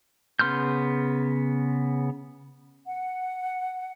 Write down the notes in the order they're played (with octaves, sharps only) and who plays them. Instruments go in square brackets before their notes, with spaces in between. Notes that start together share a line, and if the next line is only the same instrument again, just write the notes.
[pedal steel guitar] C#3 B3 C6 F6 G6
[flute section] F#5